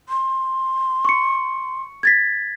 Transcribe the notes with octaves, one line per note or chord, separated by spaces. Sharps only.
C6
C#6 C#7
G#6 A6 B6